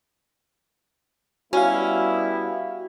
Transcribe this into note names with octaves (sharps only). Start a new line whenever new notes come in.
G3 B3 C#4 E4 F#4 F5